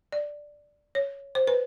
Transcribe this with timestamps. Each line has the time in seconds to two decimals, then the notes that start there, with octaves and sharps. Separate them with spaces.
0.12 D5
0.95 C#5
1.35 C5
1.47 B4